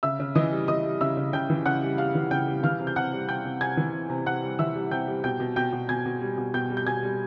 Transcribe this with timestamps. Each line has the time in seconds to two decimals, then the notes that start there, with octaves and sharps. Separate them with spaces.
0.03 C#3 E5 E6
0.20 C#3
0.35 E3 D#5 D#6
0.52 G3
0.68 E3 D#5 D#6
0.84 G3
1.01 C#3 E5 E6
1.17 C#3
1.33 C#3 G5 G6
1.50 E3
1.66 C#3 F#5 F#6
1.82 G3
1.98 G3 F5 F6
2.15 E3
2.31 C#3 G5 G6
2.47 G3
2.63 E3 F5 F6
2.80 C3
2.87 G6
2.96 C3 F#5 F#6
3.12 G3
3.29 C3 G5 G6
3.45 C3
3.61 C3 G#5 G#6
3.77 E3
3.93 C3
4.10 C3
4.26 C3 F#5 F#6
4.42 G3
4.59 E3 E5 E6
4.75 G3
4.91 C3 G5 G6
5.07 G3
5.24 B2 G5 G6
5.40 B2
5.56 B2 G5 G6
5.73 B2
5.89 B2 G#5 G#6
6.06 B2
6.22 G3
6.38 B2
6.54 B2 G5 G6
6.70 G3
6.77 G6
6.87 B2 G#5 G#6
7.03 G3